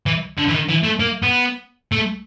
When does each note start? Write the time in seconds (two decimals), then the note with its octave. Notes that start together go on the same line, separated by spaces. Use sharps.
0.06 E3
0.38 D3
0.48 E3
0.53 D#3
0.69 E3
0.83 A3
1.00 A#3
1.23 B3
1.92 A3